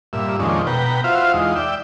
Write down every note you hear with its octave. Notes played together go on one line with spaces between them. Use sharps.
G2 A#2 E5
F2 A#2 D#3 G#3 C#4 D4
B2 B4 G5 A#5
F4 F#4 C5 E5 F5
E2 G#3 D#4 F4
D5 E5 G5